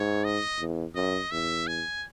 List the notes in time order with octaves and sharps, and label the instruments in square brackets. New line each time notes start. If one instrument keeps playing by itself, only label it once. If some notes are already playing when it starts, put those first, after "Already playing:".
Already playing: [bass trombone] G#2 [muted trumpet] C#5
[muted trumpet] D#5
[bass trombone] E2
[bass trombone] F#2 [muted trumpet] D#5
[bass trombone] E2 [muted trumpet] E5
[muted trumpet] G#5